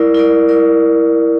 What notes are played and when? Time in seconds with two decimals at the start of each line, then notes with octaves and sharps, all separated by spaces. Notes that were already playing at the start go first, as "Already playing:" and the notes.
Already playing: E4 A#4 D5
0.15 E4 A#4 D5
0.49 E4 A#4 D5